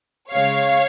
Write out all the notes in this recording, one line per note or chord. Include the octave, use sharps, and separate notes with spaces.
C#3 G#3 C#5 F5